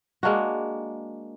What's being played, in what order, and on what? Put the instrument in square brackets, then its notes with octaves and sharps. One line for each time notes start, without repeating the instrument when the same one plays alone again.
[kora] G#3 A#3 D4 F#4